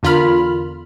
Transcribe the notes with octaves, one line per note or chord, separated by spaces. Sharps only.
E2 D3 F4 A#4 B5 F6